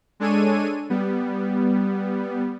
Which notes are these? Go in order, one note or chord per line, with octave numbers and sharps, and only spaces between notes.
G#3 D4 A4 C#5 G#5 D#7
G3 B3